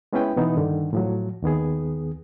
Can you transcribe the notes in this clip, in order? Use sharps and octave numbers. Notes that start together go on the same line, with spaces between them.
G#3 B3 C#4 E4 B4 G5
B2 E3 B3 D#4
G2 D3 D#3
A2 F3 F#3
D#2 D#3 B3 G#4